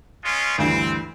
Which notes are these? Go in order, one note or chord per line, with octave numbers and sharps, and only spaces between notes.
G#3 C#4 F4
D2 G2 E3 C4